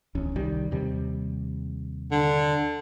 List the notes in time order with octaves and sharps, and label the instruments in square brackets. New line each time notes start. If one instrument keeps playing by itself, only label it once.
[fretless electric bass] D1 E2 C#4
C2 D#3 G3
D#2 C3 G3
[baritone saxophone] D3